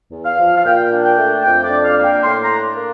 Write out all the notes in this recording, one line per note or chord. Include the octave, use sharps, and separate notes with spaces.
E2
F5
F3
F5
A#2 G5
D4
G5
A3
F2 G5
D5
D4
F5
A#3
G5
A2 C6
A#5
D4
A#3